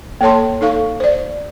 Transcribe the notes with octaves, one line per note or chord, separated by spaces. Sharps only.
A#3 A4 C#5 A5 C6
D#4 A4 F5 C#6
C5 D5